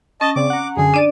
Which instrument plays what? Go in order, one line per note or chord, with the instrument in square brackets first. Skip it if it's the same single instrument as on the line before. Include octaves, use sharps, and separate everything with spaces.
[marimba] C#4 [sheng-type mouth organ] D#5 A5
[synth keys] C#3 C4 D5 [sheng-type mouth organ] D6
[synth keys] F#5 A#5
[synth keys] F#2 D3 [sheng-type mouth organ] G#4
[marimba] D4 D5 [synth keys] A6 D#7